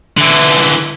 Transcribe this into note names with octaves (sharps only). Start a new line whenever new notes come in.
D3 E3